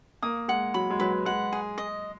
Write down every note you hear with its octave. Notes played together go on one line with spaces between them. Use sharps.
A#3 D#6
G#3 F#5
F#3 B5
G#3
F#3 B4
G#3 F#5
G#4
D#5